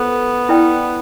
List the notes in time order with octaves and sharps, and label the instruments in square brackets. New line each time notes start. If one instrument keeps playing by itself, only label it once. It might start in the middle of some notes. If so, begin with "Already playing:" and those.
Already playing: [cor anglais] B3 [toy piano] F4 A4 C5
[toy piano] E4 B4 D5 G5